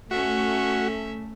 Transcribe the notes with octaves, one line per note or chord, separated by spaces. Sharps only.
A3 C#4 F#4 E5